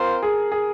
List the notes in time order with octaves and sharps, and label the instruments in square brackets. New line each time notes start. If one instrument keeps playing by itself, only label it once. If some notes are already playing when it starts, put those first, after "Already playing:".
Already playing: [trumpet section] C4 F4 C5 [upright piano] A#4
[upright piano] G#4
G#4